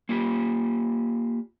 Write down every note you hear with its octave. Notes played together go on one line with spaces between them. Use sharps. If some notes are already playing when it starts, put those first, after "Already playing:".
A#3 F4 G4